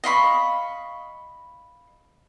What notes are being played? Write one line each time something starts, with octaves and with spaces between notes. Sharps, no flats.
D#5 F5 B5 C#6